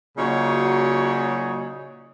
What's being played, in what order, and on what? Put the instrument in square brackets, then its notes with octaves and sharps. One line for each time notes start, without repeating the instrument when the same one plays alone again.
[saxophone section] A#2 C#3 F#3 D#4 F#4 C#5